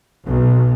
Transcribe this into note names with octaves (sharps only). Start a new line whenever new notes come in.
B1